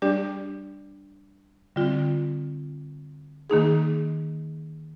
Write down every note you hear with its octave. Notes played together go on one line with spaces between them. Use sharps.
G3 D4 G4 D5
D3 G3 C4 F4
D#3 A#3 D#4 G#4